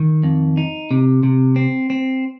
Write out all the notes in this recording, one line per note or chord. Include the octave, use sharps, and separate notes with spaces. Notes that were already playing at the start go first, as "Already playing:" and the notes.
Already playing: D#3
F2
D#4
C3
C3
C4
C4